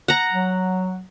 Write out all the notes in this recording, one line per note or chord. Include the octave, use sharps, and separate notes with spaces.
F#5 A#5
F#3